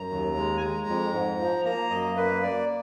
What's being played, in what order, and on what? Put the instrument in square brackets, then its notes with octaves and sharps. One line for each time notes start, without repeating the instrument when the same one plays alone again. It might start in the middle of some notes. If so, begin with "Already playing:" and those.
Already playing: [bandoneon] F#2 A#5
D#2
G#3
G#5
G#3 A#5
F2
G#2
F3
A#3 A#5
F#2 D#5
A#3 B4
A#3 D5